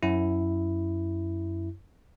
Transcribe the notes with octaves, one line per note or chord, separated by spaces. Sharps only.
F#2 E4